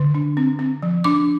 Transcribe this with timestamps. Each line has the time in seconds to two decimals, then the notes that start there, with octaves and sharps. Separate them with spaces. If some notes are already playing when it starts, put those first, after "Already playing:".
Already playing: D3
0.15 D4
0.37 C4
0.59 C4
0.82 F3
1.04 D4 D6